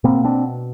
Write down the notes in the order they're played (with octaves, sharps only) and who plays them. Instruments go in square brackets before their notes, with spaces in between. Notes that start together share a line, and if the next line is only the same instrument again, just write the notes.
[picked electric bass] B2 A#3 C4
C4 D4